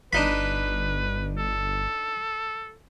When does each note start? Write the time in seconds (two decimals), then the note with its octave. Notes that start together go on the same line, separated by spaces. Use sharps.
0.13 G1 D4 D#4 B4 B5
1.38 A4